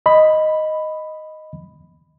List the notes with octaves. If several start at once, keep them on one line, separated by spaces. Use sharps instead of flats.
D#5 B5